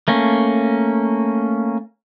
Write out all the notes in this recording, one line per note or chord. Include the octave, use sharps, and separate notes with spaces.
A3 A#3 C#4